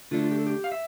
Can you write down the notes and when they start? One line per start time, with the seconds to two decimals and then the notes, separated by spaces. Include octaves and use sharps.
0.11 D3 A3 D4 F4
0.22 F4
0.31 G4
0.39 A4
0.47 G4
0.64 F5
0.72 E5